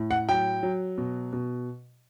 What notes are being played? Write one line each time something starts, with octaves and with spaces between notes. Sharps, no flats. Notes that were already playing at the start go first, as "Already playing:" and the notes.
Already playing: A2
F#5
F#3 G5
F#3
B2
B2